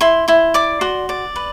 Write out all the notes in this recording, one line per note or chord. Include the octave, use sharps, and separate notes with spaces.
E4 C6
E4 C6
D5 D6
F#4 C6
D5
B4